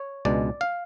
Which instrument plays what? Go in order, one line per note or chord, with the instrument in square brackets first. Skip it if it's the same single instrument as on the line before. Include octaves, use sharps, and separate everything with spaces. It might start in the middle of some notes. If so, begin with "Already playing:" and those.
Already playing: [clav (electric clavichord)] C#5
C#2 B2 G#3 D4 D5
F5